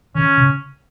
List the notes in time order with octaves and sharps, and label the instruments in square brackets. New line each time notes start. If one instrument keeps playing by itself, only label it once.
[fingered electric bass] D#3 [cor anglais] C#4
[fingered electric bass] C#3